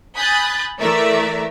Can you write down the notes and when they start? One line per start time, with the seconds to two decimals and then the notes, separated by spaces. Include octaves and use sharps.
0.16 G#5 B5 D#6 F#6 G6 A6
0.80 E3 A3 A#4 D5 E5